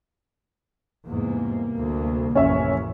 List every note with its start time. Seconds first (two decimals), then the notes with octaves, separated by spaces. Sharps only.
1.05 E2 G#2 C3 G3 A#3
1.78 D2
2.35 A1 F2 C#4 E5